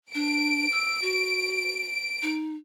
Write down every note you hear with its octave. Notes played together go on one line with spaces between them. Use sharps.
D4 D7
E6
F#4
D#4